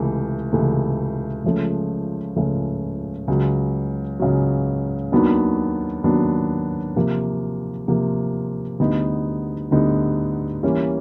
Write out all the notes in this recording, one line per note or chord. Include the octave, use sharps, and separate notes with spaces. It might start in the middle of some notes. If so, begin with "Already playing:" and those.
Already playing: C#2 C3 E3 A3
C#2 C3 E3 A3
C#2 C#3 F3 A3
C#2 C#3 F3 A3
C#2 C#3 F#3
C#2 C#3 F#3
D#2 D#3 F#3 B3 D4
D#2 D#3 F#3 B3 D4
C3 F3 A#3
C3 F3 A#3
D2 D3 G3 B3 D#4
D2 D3 G3 B3 D#4
E3 G3 A#3 C#4